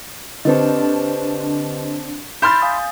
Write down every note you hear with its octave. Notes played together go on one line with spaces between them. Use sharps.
D3 C4 D4 G4 B4 D#5
E4 C6 F6 G6 A6
F5 G#5 D#6